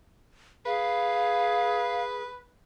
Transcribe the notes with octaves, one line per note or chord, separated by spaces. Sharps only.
G#4 B4 F5